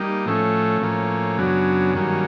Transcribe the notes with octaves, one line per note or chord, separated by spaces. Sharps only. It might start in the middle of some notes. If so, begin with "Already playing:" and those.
Already playing: G3 A#3 D#4
A2 F3 A3 C#4
A2 F3 A#3 C#4
F#2 C#3 F#3 B3 D4
G2 D#3 F#3 A#3 C#4